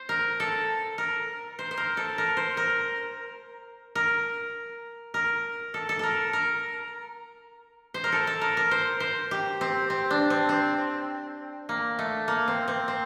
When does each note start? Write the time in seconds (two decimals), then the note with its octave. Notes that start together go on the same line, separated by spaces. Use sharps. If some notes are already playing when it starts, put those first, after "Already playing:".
Already playing: C5
0.09 A#4
0.40 A4
0.98 A#4
1.59 C5
1.71 C5
1.77 A#4
1.97 A4
2.18 A#4
2.37 C5
2.57 A#4
3.95 A#4
5.14 A#4
5.74 A4
5.89 A4
5.99 A4 A#4
6.33 A#4
7.94 C5
8.04 A#4
8.12 A4
8.27 A4
8.41 A#4
8.57 A#4
8.71 C5
9.00 C5
9.31 G4
9.61 C4
9.90 C4
10.11 D4
10.30 C4
10.49 C4
11.69 A#3
11.99 A3
12.28 A#3
12.48 C4
12.68 C4
12.88 C4